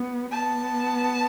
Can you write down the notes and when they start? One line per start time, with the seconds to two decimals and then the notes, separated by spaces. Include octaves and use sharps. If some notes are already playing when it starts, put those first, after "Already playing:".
Already playing: B3
0.32 B3 A5